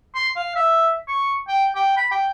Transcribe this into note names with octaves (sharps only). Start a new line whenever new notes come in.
C6
F5
E5
C#6
G5
G5
B5
G5